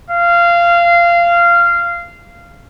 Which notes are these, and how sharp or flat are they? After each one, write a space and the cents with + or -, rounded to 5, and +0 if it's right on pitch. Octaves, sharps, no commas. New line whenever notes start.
F5 -20